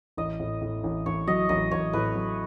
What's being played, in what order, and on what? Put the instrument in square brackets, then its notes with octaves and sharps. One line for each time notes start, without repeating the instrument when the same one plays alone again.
[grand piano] A1 [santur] D#5
[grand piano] A2
A2
A1
[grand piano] A1 [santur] C#5
[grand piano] F#3 [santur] D#5
[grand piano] A1 [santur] D#5
[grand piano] A1 [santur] C#5
[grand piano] A2 [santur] B4
[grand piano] F#3